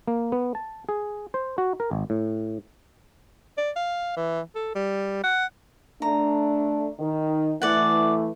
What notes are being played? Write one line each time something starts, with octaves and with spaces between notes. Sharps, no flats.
A#3
B3
A5
G#4
C5
F#4
A#4
G#1
A2
D5
F5
E3
A4
G3
F#5
A3 D4 A#5
D#3
E3 A3 D5 F#5